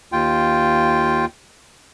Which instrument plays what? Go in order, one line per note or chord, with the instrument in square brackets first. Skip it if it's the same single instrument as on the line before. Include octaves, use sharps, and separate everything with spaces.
[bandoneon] D#2 F4 G5